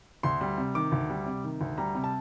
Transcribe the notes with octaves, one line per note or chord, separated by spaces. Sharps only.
D2 C6
G3
C3
D#3 D6
D2
G3
C3
D#3
D2
G3 A#5
C3
A5